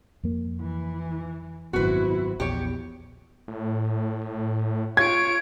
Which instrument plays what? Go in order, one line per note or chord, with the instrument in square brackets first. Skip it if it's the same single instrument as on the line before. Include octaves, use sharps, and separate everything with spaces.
[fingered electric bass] F2 A#3
[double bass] E3
[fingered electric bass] G#1 F#2 B2 [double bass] C4 E4 [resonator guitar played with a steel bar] F#4 B4
[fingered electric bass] A#1 [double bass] E2 [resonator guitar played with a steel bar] G4 C#5
[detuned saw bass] A2
[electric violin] F4 D7 [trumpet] C#5 [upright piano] G#6